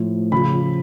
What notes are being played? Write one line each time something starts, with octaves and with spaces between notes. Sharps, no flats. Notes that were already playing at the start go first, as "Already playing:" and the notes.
Already playing: A2 F3
C#3 F3 B5